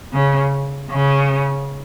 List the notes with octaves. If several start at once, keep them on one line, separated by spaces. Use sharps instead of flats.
C#3
C#3